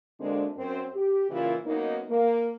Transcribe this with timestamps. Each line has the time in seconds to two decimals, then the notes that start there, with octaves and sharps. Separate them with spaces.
0.18 D2 D3 G#3 A#3 C4 D4
0.57 F#2 C4 C5
0.94 G4
1.30 A#2 C#3 E3 A#3 E4 F4
1.65 F#2 A#3 B3 D#4
2.09 A#3